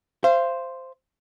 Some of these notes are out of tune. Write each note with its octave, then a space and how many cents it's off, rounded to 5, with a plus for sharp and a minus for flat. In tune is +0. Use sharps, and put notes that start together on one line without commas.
C5 +0 F5 -35